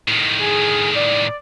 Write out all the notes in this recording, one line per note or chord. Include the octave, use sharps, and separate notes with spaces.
A2 D#3
G#4
D5